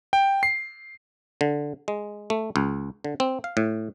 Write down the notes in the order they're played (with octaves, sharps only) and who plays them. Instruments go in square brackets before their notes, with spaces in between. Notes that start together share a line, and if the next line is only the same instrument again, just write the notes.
[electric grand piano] G5
C7
[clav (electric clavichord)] D3
G#3
A3
C#2
D3
C4
F5
A2